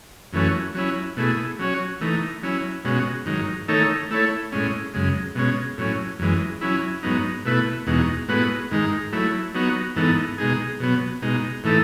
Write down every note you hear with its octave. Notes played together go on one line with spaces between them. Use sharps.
F#2 E3 A3 C#4 F#4
F#3 C#4 E4
B2 A3 E4 G#4
F#3 C#4 F#4 C#5
E3 A3 D#4
F#3 C#4 E4
B2 G#3 C#4 F#4
G#2 D#3 F#3
D#3 A3 D#4 A4 C#5
A3 E4 A4 C#5
A2 G#3 C#4
F#2 C#3 G#3
B2 G#3 C#4
A2 F#3 C#4
F#2 E3 G#3
F#3 C#4 E4
G#2 F#3 B3 D#4
B2 A3 E4 B4
E2 B2 G#3 D#4 F#4
A2 G#3 B3 F#4 B4
G#2 D#3 G#3 D#4
F#3 A3 E4
F#3 B3 D#4 F#4
G#2 E3 B3 D#4 A4
B2 G#3 D#4 G#4
B2 F#3 B3
B2 G#3 D#4
A2 E3 A3 D#4 A4